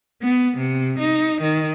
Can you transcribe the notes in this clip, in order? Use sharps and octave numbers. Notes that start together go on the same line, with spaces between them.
B3
C3
D#4
D#3